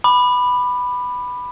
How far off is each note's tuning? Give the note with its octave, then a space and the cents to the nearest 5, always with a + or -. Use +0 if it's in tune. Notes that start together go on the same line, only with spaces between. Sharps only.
B5 +0 D6 +35